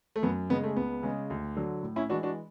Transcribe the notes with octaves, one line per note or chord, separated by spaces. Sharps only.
A3
F#2 B3
C#3 G#3 B3
A3
C#2 B3
C#3 G#3
D2
D3 F#3
A2
C#4 E4
E3 G#3 D4 F#4
D4 F#4